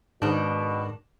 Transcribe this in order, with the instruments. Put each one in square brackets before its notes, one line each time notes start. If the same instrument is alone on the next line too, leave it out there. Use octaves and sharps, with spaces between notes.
[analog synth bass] G#2 [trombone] B2 [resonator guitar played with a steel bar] D#3 D4